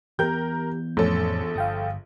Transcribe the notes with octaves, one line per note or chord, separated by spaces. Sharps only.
E3 B3 G4 A#4 G6
A#1 F2 A2 C#4 A4
G1 F5 G5 D#6